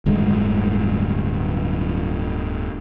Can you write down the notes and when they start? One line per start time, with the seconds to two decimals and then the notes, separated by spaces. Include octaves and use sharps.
0.06 D1 D2 G2 G#3